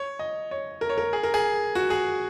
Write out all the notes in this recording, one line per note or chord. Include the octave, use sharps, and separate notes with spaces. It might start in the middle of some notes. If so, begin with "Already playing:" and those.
Already playing: C#5
D#5
C#5
A#4
C#5
A#4
G#4
A#4
G#4
F#4
G#4